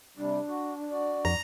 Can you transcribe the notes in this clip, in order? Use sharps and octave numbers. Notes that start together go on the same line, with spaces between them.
C3 G3 D4
F#4
F#4 D5
F2 A#5